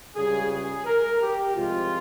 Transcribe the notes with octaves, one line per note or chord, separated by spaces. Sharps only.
C#2 C#3 G3 G#4
G#4
A#4
G4
C2 C3 F3 G#3 F4